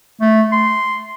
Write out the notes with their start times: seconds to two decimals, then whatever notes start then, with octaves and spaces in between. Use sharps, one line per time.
0.21 A3
0.52 C6